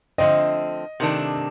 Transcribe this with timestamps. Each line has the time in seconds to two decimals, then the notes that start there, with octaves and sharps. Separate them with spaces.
0.18 D3 F3 A3 C4 D#5
1.00 C3 D#3 A3 D4